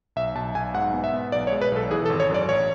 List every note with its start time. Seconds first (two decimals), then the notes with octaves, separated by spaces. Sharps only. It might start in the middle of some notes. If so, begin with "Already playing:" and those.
0.16 B1 E5
0.35 B1 A5
0.55 B1 G#5
0.74 G#2 F#5
0.94 B3
1.04 E5
1.13 B3
1.32 B1 D5
1.47 C#5
1.52 G#3
1.61 B4
1.72 B1 A4
1.91 E3 G#4
2.06 A4
2.10 G#1
2.20 C#5
2.30 F#2 D5
2.48 A1 C#5